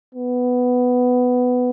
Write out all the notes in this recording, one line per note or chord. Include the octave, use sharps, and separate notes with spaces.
B3